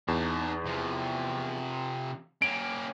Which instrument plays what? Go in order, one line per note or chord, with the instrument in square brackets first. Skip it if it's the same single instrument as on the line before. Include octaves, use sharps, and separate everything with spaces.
[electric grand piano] E2 [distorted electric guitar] D#4 A5
[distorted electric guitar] C3 F3
[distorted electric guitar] A#3 C#4 [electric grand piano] D7